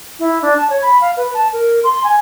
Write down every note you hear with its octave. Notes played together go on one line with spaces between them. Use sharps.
E4
D4
A5
C#5
B5
F5
B4
A5
A#4
C6
G#5